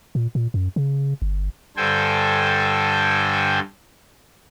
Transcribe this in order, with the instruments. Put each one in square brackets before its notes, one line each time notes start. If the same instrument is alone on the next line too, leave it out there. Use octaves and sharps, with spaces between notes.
[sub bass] A#2
A#2
F#2
C#3
G1
[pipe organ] G2 D3 A4 C5 G5 G#5